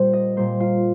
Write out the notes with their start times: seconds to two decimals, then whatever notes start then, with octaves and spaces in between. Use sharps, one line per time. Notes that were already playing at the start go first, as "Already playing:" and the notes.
Already playing: A#2 G3 A#3 C5
0.13 D#5
0.36 A#2 G3 A#3 C5
0.60 F4